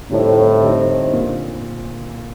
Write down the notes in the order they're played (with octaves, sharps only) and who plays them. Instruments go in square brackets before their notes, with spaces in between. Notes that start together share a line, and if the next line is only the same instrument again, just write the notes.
[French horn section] A2 [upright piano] D3 G3 C4 D#4
[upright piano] D3 G3 C4 D#4
A#2